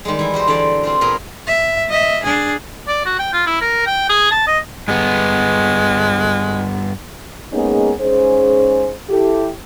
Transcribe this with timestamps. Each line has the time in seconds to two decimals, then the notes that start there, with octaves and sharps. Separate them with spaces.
0.05 D#3 G3 G#3
0.19 E3 E4
0.34 G3 F#4 C5
0.47 D3 E3 C5 D5
0.83 C4 F4 C5
1.01 A#2 B3 G#4 A#4 B5
1.47 E5
1.89 D#5 E5
2.23 D4 G#4
2.88 D5
3.05 F#4
3.19 G5
3.33 F4
3.46 E4
3.61 A#4
3.86 G5
4.09 G#4
4.31 A5
4.47 D#5
4.88 G2 G#3 B3
7.53 G#3 A#3 B3 C#4 D#4 G#4
8.01 G#2 C#4 G#4 C5
9.10 E4 G4 A4